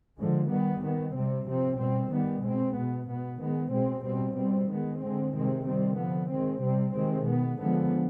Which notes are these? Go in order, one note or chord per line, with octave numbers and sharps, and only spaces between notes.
D3 F3 G#3
D#3 G3 B3
D#3 B3
C3 G3 C4
C3 F3 C4
B2 G3 C4
D#3 G3 B3
B2 G#3 C4
B2 B3
B2 B3
D#3 G#3 B3
B2 G#3 C4
B2 G3 C4
B2 G3 C4
D#3 G#3 B3
D3 G#3 C4
C3 D#3 G#3 C4
D#3 G3 C4
D3 F3 B3
D#3 G#3 C4
C3 G3 C4
C3 D#3 G#3 C4
B2 B3
D3 F3 G#3 B3